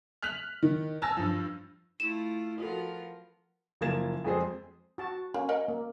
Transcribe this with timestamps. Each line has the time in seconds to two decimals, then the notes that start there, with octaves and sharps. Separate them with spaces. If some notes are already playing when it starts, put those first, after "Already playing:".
0.23 F6 F#6 B6 F7 F#7
0.63 D#3
1.02 G#5 A5 E6 F6 A6 A#6
1.17 G2 F3
2.00 A3 E4 F4 E7
2.58 F3 B3 F4 F#4 A4 A#4
3.81 F#1 F3 A#3 G#6 A6 E7
4.25 F2 G#3 C4 G#4 C5
4.98 F#4 A5
5.34 A#3 C#4
5.49 A#4 D#5 F#5
5.68 A#3